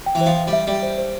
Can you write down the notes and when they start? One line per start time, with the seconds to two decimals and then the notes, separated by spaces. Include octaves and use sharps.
0.06 G5
0.15 E3
0.21 C5
0.26 F3
0.37 G5
0.47 G3
0.53 E5
0.67 G3 E5
0.83 C5
0.98 C5